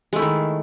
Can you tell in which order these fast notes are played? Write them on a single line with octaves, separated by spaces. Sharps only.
G#3 A3 E4 D#3